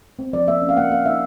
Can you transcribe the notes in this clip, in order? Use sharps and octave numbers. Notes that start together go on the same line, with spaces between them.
C4
F3 D5
A#3 E5
C#4
F5
A#3 F#5
A#3 F5
D#4 E5